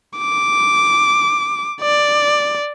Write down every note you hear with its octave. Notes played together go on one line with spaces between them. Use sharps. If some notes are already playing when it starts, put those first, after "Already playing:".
D6
D5